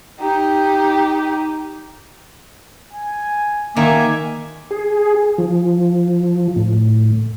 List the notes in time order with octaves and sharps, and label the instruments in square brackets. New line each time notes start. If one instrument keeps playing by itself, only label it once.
[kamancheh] D#4 G4
[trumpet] G#5
[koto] D#3 [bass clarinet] A#3 [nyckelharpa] E5 G#5 [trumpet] D6
[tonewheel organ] G#4
F3
A2